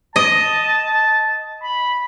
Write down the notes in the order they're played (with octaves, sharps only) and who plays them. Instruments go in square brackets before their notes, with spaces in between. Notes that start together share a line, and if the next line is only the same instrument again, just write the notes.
[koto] D#5 [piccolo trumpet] A5
[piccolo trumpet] B5